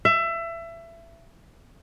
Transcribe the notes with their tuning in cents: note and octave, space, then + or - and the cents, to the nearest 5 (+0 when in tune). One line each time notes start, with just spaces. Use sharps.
E5 +25